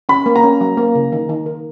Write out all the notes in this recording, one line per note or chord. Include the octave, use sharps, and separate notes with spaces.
C#4 B5
A#3
A#5
C#4
F#3
A#3
C#3
D#3
D#3
A#4